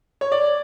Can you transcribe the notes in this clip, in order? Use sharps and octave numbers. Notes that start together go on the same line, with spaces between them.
C#5
D5